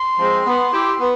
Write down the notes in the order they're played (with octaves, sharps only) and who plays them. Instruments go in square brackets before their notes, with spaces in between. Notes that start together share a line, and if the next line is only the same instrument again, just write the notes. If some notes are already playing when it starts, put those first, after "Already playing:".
Already playing: [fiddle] C6
[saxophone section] F3 G#3 C4
B3
E4 G4
B3